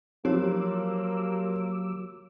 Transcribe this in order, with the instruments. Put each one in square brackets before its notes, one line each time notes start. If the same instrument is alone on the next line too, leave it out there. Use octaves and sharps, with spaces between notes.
[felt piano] F3 [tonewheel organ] F#3 D6 E6 [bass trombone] A#3 [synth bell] G4 C#5